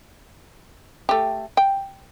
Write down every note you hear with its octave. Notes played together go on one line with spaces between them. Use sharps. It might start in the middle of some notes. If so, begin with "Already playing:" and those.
A3 G4
G5